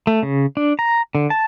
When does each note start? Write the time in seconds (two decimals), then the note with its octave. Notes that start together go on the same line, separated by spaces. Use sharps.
0.07 A3
0.23 C#3
0.57 D4
0.79 A#5
1.15 D3
1.30 A5